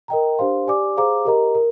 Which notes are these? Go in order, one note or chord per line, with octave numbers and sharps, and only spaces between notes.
A#4 D#5 G5 A#5
D4 G4 C5 F5 C6
G4 D5 G#5 D6
G#4 C5 F5 A#5 D6
G4 A#4 D#5 A#5
A#4